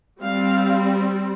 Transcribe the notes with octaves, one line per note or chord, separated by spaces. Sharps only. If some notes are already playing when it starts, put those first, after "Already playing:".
G3 C4 F5